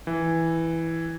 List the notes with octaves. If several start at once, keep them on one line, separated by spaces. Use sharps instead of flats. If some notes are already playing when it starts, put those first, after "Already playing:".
E3